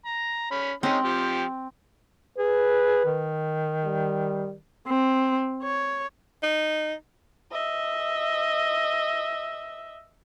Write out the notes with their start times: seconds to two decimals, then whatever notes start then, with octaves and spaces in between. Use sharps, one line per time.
0.06 A#5
0.51 C#4 B5
0.83 G#3 C4 C#4 D#4
1.04 F3 G4
2.38 G#4 B4
3.05 D#3
3.85 G3
4.87 C4
5.63 C#5
6.43 D#4
7.52 D#5 E5